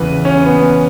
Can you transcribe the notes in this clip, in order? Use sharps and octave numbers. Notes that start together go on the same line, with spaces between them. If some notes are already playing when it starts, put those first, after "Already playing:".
Already playing: E2 C#3 E3 B4
C#4
B3